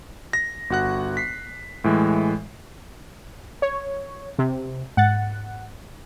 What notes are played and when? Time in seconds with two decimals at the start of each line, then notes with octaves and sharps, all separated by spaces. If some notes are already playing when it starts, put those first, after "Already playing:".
0.33 A#6
0.70 G1 F#4 F#5 F#6
1.17 B6 C7
1.84 A2 E3 G#3
3.62 C#5
4.39 C3
4.97 G#2 F#5 A6